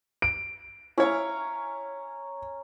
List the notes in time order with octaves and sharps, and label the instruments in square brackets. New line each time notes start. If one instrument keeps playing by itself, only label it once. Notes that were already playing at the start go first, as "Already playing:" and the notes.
[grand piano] D7
[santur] C#4 A#5 [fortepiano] E4 C#5